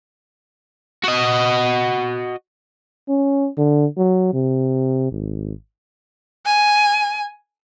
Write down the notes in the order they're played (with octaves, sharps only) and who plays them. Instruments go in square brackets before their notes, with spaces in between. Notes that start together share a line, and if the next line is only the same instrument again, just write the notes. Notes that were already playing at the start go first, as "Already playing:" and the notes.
[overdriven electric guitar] F#4 D#5
[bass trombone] C#4
D3
F#3
C3
G#1
[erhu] G#5